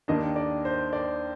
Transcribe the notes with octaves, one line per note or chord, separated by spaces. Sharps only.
D#2 D#3 A#3 D4 D#5
D5
C5
D5